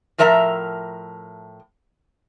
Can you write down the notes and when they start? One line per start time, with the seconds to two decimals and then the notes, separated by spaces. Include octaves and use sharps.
0.18 A2 F3 A#4 E5 G5 A#5